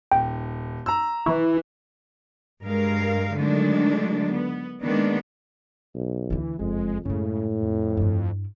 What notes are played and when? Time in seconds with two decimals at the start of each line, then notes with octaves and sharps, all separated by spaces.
0.12 D#1 G5
0.86 A#5 E6
1.26 E3 E4 C#6
2.64 G2 G#3 A#4 F5
3.35 D3 D#3 F#3 G#3 A3 D4
4.28 B3
4.82 D#3 G#3 A#3 B3 D4
5.94 B1
6.30 D2 D3 E3
6.59 F#1 F2 G#3
7.05 F#2 A2 C#3 G#3
7.62 F2
7.97 G2 E4